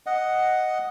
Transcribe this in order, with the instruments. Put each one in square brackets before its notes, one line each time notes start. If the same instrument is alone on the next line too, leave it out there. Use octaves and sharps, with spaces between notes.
[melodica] D#5 F#5